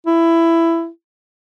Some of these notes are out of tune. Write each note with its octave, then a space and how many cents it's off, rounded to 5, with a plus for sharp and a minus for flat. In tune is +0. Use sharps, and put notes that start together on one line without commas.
E4 +15